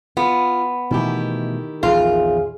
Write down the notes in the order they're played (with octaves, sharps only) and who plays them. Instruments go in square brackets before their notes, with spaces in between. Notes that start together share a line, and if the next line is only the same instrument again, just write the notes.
[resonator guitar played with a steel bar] B3 [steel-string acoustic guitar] F4
[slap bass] B2 E3 A3 [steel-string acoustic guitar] D#3 E4 G4
[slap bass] A#1 E2 [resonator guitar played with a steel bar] F4 [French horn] G#4